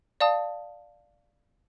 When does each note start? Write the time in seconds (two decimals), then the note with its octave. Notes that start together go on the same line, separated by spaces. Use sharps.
0.20 D5 F5 A5 D#6